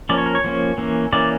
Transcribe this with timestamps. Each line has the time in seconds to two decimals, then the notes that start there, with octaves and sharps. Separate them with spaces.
0.09 F3 A#3 C#4 D5
0.18 C#5
0.26 A#4
0.35 C#5
0.44 F3 A#3 C#4
0.78 E3 A#3 C#4
1.13 E3 A#3 C#4 D5